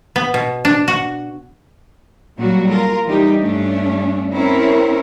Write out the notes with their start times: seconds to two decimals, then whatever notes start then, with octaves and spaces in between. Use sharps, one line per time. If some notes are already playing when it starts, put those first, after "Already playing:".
0.16 B3
0.34 B2
0.65 D4
0.88 F#4
2.37 A#2 F#3 G3 A#3 F#4
2.69 F4 A#4
3.05 E3 G3 D#4 G4
3.39 G2 A3 C#4 D4
4.33 C4 C#4 E4 A#4 C#5